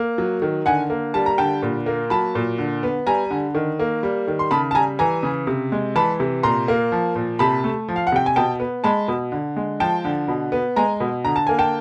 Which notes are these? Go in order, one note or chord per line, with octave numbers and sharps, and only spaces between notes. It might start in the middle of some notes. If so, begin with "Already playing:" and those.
Already playing: A#3
F#3
D#3
D3 F#5 G#5
A#3
G3 A5
A#5
D3 G5 A5
A#2
A#3
F#3 A5 B5
A#2
D3
B3
G3 G#5 A#5
D3
D#3
A#3
G3
D#3
C6
C#3 A5 B5
A5
G3 G#5 A#5
E3 G#5 A#5
C#3
C3
G#3
E3 A5 B5
C3
A#2 A#5 C6
A#3
F3
A#2
C3 A5 B5
A3
F3
F5
F#5
C3 G5
G#5
B2 G5 A5
B3
G#3 A5 B5
B2
D3
G#3
F3 G5 A5
D3
B2
B3
G#3 G#5 A#5
B2
D3 A#5
A5
A#3 G#5
G5 A5